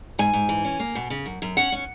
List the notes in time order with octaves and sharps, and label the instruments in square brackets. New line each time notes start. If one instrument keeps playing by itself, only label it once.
[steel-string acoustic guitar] G#2 G#5
G#2
E3
C#4
A#3
B2
C#3
F#2
F#2
C#4 F#5
C#4